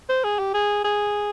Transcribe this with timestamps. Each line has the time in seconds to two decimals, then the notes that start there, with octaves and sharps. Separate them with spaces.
0.09 C5
0.24 G#4
0.39 G4
0.54 G#4
0.84 G#4